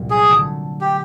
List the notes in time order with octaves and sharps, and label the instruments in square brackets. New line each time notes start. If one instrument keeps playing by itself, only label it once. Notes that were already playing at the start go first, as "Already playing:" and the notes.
Already playing: [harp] C2 A#2 F#3
[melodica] G#4
[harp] D3 F#3 A3
[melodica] G4